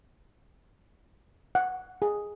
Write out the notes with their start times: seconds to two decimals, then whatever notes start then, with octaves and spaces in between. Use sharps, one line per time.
1.55 F#5
2.02 G#4